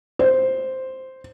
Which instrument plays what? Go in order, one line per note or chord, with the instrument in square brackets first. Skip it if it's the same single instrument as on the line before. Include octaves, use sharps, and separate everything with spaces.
[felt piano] C5